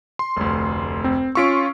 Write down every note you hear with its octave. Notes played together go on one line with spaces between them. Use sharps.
C6
F1 D2
C4
C#4 F4 C#6 E6 B6 D7